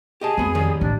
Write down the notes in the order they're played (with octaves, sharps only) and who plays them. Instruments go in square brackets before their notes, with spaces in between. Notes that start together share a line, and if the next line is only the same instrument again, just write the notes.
[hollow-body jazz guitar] G4 D#5 A5 [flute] G#4
[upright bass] F2 [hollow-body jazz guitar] G#3 B3 F#4
[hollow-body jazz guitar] A2 D#3 G3
[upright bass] A1 [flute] D4